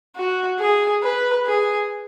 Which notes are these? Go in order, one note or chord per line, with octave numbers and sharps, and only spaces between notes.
F#4
G#4
B4
G#4